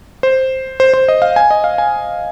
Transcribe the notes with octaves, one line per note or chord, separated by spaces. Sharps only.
C5
C5
C5
D#5
F5
G#5
D#5
F5
G#5